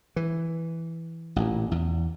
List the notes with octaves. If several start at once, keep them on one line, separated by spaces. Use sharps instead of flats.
E3
A1 A#2
E2